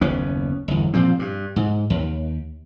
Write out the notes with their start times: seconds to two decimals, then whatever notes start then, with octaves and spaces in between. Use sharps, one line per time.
0.01 F#1 D#2 B3 C#4
0.68 G1 E2
0.94 A#2 F3 C4
1.19 G2
1.56 G#2
1.90 D#2